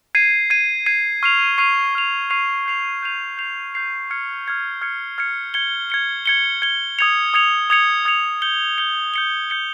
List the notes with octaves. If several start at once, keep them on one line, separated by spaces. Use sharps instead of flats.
G#6 C7 D#7
G#6 C7 D#7
G#6 C7 D#7
C#6 F6 C7 F7
C#6 F6 C7 F7
C#6 F6 C7 F7
C#6 F6 C7 F7
G6 C7 F7
G6 C7 F7
G6 C7 F7
G6 C7 F7
F6 G#6 C#7
F6 G#6 C#7
F6 G#6 C#7
F6 G#6 C#7
G#6 C#7 G7
G#6 C#7 G7
G#6 C#7 G7
G#6 C#7 G7
D#6 G#6 C#7 F7
D#6 G#6 C#7 F7
D#6 G#6 C#7 F7
D#6 G#6 C#7 F7
G6 C#7 G7
G6 C#7 G7
G6 C#7 G7
G6 C#7 G7